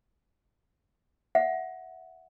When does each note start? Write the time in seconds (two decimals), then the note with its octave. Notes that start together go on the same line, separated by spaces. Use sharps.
1.35 E5 F#5